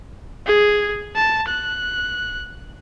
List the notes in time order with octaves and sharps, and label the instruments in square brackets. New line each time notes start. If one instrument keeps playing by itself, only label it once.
[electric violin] G#4
A5
F#6